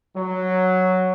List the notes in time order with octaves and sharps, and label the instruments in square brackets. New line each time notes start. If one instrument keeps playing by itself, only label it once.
[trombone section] F#3